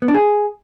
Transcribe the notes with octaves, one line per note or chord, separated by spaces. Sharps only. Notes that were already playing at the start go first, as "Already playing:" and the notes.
B3
D4
G#4